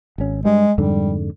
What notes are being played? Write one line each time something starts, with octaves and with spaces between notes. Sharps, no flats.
G#1 C#4
G2 G3 G#3
F2 G#2 D3 G3